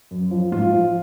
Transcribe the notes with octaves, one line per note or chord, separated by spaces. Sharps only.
F#2
F3
G#2 F4
F3